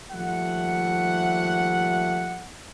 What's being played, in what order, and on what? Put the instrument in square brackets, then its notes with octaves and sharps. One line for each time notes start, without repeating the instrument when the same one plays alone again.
[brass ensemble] D#2 F3 G3 A3 E5 F#5